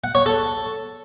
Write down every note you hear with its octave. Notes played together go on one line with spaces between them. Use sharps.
F#5
C#5
A4